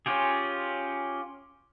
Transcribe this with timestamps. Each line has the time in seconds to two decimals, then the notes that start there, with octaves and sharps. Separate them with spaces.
0.06 C#4 F4 G4 G#4